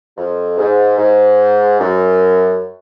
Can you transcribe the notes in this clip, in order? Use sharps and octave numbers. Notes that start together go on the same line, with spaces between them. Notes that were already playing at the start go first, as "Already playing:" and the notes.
F2
G#2
G#2
F#2